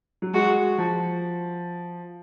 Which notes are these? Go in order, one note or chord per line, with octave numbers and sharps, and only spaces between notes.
F#3
G#3 F#4
F3